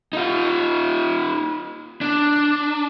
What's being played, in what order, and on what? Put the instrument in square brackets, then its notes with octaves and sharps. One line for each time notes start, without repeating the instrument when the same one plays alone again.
[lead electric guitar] D#4 F4
D4